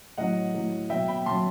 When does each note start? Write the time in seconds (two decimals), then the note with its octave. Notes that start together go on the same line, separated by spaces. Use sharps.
0.17 A2 F#3 D#5 F#5
0.54 A2 F#3
0.90 B2 F#3 E5 G5
1.08 G5 B5
1.26 B2 F#3 A5 C6